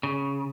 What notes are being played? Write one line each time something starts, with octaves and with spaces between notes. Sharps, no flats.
C#3